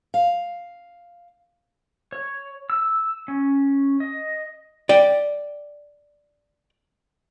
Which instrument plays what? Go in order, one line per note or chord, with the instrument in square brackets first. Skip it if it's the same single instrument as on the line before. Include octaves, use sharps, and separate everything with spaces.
[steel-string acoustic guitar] F5
[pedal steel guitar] C#5
E6
C#4
D#5
[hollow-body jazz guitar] D5 G5